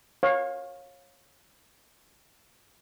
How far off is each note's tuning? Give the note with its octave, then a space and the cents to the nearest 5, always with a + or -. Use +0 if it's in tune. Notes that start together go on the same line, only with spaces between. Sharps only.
C#5 -20 F5 +20